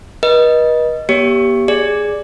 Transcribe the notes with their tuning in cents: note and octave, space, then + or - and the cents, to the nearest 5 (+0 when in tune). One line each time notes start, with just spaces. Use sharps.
B4 -40 D#5 +0
B3 -45 G4 -5 C#5 +25
G#4 +0 D5 +0